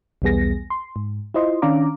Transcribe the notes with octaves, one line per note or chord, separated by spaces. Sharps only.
B1 E2 G3 B3 G#4 A#6
C6
G#2
E4 F4 C5 D#5 C6
D#3 C#4 D4 F5 A#5 D6